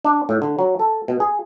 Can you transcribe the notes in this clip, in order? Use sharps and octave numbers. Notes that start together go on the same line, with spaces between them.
D4
A2
D3
F#3
A4
B2
G#4